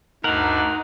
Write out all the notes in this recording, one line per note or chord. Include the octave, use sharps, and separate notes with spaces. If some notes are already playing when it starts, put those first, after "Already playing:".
D2 G2 D4 D#4 A#4 F#5